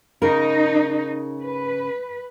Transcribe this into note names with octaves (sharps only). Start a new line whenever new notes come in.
C#3 D#4 A#4
B4